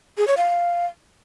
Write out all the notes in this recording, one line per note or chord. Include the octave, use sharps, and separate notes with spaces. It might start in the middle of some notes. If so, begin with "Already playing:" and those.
G#4
C#5
F5